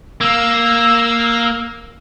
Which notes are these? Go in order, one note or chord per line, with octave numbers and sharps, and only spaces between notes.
A#3 E6